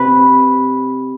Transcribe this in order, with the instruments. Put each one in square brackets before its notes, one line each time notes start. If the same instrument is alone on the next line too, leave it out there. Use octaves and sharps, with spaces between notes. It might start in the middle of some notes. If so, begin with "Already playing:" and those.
Already playing: [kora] C3 B4